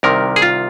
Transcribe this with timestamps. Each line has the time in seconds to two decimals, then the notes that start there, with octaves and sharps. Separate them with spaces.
0.03 C2 C3 D#3 A#4
0.36 G#4
0.42 F4